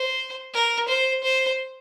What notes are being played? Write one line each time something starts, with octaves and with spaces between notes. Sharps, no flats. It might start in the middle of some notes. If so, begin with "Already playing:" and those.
Already playing: C5
A#4
C5
C5